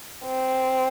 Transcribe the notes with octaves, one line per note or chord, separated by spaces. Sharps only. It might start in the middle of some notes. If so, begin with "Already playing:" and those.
C4